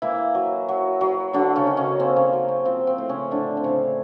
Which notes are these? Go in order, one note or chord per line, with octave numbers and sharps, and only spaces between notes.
E3 A#3 E4
F#3
F#3
F#3
D3 F#3 D4
C#3 C#4
D#3
C#3 C#4
A#3 C4
C#3 C#4
F#3
C4
F3 C4
C4
A2
C#3 C#4
A2 D3 D4
C4
A2 C#3 C#4